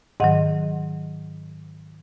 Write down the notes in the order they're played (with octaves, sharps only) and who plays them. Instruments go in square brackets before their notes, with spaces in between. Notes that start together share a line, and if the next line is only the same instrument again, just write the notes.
[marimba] G#2 D#3 F#3 D#5 F#5